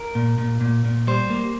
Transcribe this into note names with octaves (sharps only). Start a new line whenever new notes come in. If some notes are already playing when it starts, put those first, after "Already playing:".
Already playing: A#4
A#2
A#2
A#2
A#2
G3 C5
A#3